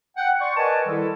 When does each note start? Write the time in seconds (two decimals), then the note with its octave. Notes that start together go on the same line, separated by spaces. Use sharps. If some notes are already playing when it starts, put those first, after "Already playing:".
0.17 F#5 G5
0.40 D5 C6 C#6
0.57 A#4 B4 D5 D#5 G#5 A5
0.87 D#3 G3 E4 A4